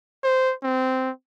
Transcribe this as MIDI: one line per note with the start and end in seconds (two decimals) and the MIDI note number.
0.24 0.54 72
0.63 1.10 60